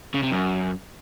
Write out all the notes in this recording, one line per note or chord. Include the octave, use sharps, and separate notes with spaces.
C#3
C3
F#2